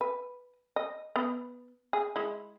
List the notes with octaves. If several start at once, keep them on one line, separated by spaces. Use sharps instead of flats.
B4
D#5
B3
G#4
G#3 E4